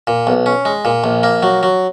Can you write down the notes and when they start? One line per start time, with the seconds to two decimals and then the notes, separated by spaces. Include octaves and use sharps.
0.07 A#2
0.27 B1
0.46 C#4
0.65 G#3
0.85 A#2
1.04 A#1
1.23 A#3
1.43 F#3
1.63 F#3